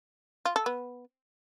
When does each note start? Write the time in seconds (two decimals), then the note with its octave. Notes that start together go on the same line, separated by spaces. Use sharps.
0.45 F4
0.56 A4
0.66 B3